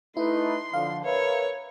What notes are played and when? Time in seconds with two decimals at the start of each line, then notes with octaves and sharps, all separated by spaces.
0.17 A3 D#4 E4 B4 C6
0.74 D3 F3 F5
1.04 A#4 B4 C#5 E5